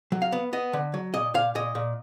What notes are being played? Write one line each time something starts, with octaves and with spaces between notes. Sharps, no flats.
F#3
F5
B3
B3 D#5
D3
F#3
A#2 D#5
A#2 F5
A#2 D#5
A#2